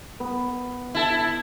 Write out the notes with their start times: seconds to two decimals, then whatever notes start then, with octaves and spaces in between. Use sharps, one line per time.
0.20 B3
0.95 E4 A4